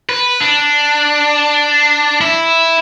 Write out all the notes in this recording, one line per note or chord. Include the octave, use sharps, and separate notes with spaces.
B4
D4
E4